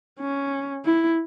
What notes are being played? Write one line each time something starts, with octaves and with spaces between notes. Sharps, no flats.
C#4
E4